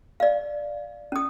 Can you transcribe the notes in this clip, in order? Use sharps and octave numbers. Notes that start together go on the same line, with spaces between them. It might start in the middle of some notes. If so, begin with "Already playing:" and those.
D5 F5
C#4 D#6